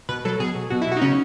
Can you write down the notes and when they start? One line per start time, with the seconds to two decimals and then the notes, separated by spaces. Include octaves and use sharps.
0.09 B2 B4
0.25 F#3 A4
0.40 B2 G#4
0.55 F#3
0.70 B2 F#4
0.82 F#3 E4
0.92 F#4
0.97 D#4
1.02 C#3 C#4